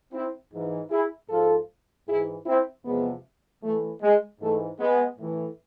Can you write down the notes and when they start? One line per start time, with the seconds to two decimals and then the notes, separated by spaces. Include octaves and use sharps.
0.13 C4 E4
0.52 G#2 E3
0.91 E4 G#4
1.30 G#2 F3 F4 A4
2.07 G#2 E3 E4 G#4
2.46 C4 E4
2.85 E2 C3 F3 G#3 B3
3.63 A2 E3 A3
4.02 G#3
4.40 G#2 E3 A3
4.79 G#3 B3
5.18 A2 E3